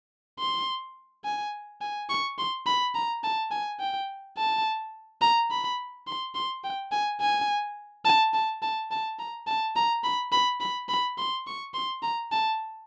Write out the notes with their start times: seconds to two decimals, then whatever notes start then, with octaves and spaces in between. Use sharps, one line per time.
0.39 C6
1.25 G#5
1.81 G#5
2.09 C#6
2.38 C6
2.66 B5
2.95 A#5
3.24 A5
3.51 G#5
3.80 G5
4.37 A5
5.22 A#5
5.51 B5
6.07 C6
6.35 C6
6.64 G5
6.92 G#5
7.21 G#5
8.05 A5
8.33 A5
8.62 A5
8.91 A5
9.19 A#5
9.47 A5
9.76 A#5
10.04 B5
10.32 B5
10.60 B5
10.89 B5
11.18 C6
11.47 C#6
11.74 C6
12.02 A#5
12.32 A5